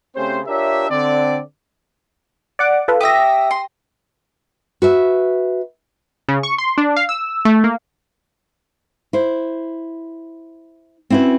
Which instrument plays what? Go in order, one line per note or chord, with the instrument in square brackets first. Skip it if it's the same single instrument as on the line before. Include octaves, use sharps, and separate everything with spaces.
[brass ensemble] C#3 A3 C4 C#4 G4 C5
D4 F4 G4 A#4 C#5 E5
D3 C4 D5
[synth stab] D5 F#5 D6
F4 A4 B4
[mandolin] G4 E5 [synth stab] D#6 A#6
[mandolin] C6
[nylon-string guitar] F#4 B4 E5
[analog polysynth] C#3
C#6
C6
D4
F5
E6
A3
A#3
[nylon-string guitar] E4 C5
C4 C#4 E4 F#4 B4